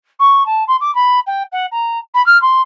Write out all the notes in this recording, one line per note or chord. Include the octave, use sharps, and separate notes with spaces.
C#6
A5
C6
D6
B5
G5
F#5
A#5
B5
F6
C6